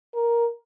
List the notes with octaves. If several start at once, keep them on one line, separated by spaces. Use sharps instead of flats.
A#4